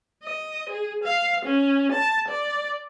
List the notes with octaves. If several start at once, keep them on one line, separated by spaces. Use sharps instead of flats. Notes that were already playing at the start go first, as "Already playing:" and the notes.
D#5
G#4
F5
C#4
A5
D5